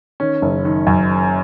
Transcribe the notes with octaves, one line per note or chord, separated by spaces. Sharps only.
D#3 C#4
F#1
D#3
F#2